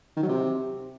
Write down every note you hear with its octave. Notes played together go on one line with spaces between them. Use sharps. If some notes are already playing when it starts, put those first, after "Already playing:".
D#3
F#3
C3